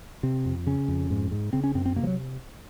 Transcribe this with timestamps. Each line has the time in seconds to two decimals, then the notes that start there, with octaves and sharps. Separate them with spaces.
0.23 C3 C4
0.45 F2
0.67 C#3 C#4
0.88 F2
1.11 G#2
1.31 G#2
1.53 C#3 C4
1.64 C#4
1.75 F#2 C4
1.86 C4
1.96 C3 A#3
2.03 F3
2.07 F#3